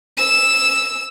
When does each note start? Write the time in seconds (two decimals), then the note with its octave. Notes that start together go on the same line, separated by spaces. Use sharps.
0.18 E6 E7